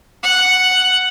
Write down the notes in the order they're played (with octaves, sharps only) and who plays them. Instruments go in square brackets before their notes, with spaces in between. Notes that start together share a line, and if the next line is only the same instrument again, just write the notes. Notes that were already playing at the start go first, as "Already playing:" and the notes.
[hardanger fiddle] F#5